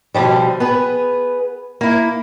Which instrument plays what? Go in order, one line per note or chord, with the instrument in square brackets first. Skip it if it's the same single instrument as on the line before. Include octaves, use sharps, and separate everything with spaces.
[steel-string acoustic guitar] B2 D3 E3 F3 G3
B3 G#4 B4
A#3 E4